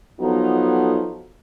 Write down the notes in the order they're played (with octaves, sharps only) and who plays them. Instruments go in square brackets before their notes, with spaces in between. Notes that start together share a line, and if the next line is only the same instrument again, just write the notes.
[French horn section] F3 F#3 B3 D#4 A4